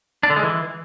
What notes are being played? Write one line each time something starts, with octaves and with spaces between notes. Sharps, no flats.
D4
D3
G#3
E3